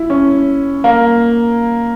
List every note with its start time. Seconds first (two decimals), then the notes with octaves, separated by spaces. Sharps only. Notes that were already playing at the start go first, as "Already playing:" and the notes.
Already playing: E4
0.10 C#4
0.84 A#3